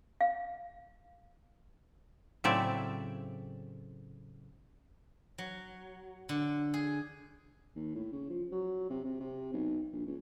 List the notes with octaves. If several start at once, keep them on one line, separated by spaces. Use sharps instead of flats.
F5
A2 C#3 F#3 C4 D5 E5
F#3
D3
G#4
D#2
A2
C#3
F3
F#3
C3
C3
C3
B1
A#1
C#2